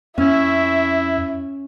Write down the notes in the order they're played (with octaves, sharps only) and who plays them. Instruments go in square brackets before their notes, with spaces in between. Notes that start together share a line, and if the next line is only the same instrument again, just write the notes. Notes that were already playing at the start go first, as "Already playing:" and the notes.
[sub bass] F2 [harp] C#4 [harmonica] E4 [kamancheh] E5